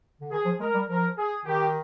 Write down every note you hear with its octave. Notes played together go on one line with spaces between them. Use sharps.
D3
D#3 G#4
F3
G#3 A#4
G3
F3 A#4
G#4
D#3 G4